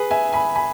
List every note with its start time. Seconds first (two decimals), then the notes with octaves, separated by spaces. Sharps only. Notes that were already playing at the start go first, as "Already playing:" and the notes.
Already playing: G#4 B4
0.11 E5 G#5
0.33 G#5 B5
0.55 G#5 B5